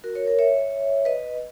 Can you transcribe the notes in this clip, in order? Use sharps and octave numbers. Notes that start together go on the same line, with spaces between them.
F#4 A#4
A#4 C#5
A#4 C#5
C#5 E5
B4 D#5